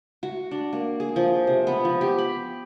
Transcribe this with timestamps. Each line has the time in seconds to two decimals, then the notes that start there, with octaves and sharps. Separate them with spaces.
0.23 F#4
0.51 D4
0.73 A#3
1.00 G#4
1.16 F3
1.47 C3
1.67 B3
1.85 F3
2.01 G4
2.18 B5